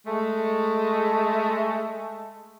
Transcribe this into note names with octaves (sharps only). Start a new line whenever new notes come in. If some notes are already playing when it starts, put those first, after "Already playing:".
G#3 A3